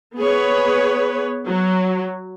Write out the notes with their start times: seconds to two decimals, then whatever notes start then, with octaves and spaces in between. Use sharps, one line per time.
0.17 B3 G#4 B4 C#5
1.47 F#3